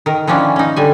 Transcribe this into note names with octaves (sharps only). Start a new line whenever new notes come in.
D#3 A#4
D#3 F3 A#3 C#4 D4 E4
C#4 D#4
D3 G3 G#5